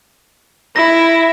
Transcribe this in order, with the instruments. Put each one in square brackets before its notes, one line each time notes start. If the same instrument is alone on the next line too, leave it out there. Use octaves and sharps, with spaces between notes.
[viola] E4 [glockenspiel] A#6